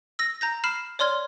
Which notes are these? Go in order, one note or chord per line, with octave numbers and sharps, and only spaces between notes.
E6 A#6
A#5 G6 A#6
B5 F6 C7 E7
C#5 D5 C6 F6 G#6